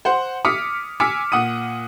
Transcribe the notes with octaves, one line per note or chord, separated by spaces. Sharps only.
C5 F#5 C6
D6 D#6 F6 B6 C#7
G#5 D6 E6 F6 B6 C#7
A#2 F#5 D#6 D#7